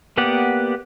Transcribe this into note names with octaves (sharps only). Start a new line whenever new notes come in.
A#3 B3 G4 D5 F#5